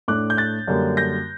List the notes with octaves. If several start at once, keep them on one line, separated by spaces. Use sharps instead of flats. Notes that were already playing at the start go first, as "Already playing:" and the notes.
A2 A3 D4 D6 F#6
G6
F#6 A6
F#2 D3 G3 A#3
G6 A#6